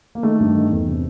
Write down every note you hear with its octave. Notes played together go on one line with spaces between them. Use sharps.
A#3
D#3 A3
G2
D#3
E2
C3